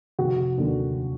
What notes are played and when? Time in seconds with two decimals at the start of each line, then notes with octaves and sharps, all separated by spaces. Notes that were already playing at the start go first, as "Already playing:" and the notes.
0.19 F1 F#4
0.57 D#2 D3 F#3